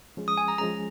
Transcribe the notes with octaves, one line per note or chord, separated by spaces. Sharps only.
F3 G#3 C#4 G#4
D#6
G#5
A#5
F3 G#3 C#4 G#4 A#5